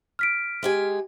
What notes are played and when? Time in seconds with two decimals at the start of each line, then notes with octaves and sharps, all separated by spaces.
0.19 F6 B6 D7
0.63 G#3 G4 G#5